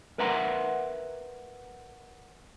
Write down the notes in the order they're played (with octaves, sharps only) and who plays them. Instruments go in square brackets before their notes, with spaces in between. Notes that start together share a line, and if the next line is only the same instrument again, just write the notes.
[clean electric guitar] A#4 B4 E5 F#5 A#5 C6